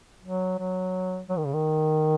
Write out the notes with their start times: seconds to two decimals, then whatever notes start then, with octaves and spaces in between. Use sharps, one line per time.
0.23 F#3
0.58 F#3
1.29 F#3
1.38 D#3
1.46 C#3
1.54 D#3